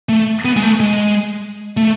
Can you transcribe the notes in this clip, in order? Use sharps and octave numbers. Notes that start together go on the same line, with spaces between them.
A3
B3
G#3
A3
G#3
A3